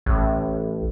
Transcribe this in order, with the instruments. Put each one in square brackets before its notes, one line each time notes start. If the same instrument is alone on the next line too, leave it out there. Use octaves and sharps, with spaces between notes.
[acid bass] A1